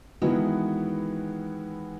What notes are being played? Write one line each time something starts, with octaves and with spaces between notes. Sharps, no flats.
D#3 E3 G#3 B3 E4 F#4